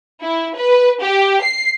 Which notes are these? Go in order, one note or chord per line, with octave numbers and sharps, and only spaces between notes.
E4
B4
G4
C7